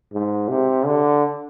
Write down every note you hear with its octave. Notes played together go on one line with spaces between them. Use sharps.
G#2
C3
D3